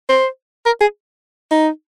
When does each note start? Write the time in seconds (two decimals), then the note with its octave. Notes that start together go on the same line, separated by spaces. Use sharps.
0.09 C5
0.66 A#4
0.81 G#4
1.51 D#4